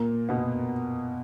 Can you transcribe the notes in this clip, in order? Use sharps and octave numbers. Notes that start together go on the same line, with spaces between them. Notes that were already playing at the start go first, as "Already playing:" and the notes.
Already playing: A#2 A#3
B2 B3